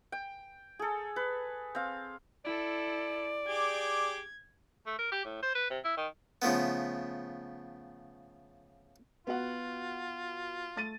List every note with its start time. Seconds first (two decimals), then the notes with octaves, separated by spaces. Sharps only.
0.12 G5
0.79 G#4 A4
1.16 B4
1.75 C4 F5
2.45 E4 A4 D5
3.47 G4 G#4 D6 G#6
4.86 A3
4.99 A#4
5.12 G4
5.25 A2
5.42 C5
5.55 B4
5.70 C3
5.85 E4
5.97 D#3
6.42 C#3 F3 A3 B3
9.27 B3 F4 F#4 F#5
10.76 A3 A6 D#7